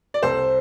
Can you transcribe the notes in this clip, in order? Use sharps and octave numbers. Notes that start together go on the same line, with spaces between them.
D5
C2 A4 C5